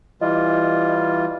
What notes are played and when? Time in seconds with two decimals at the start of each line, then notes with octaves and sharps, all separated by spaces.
0.21 E3 G3 F4 D#5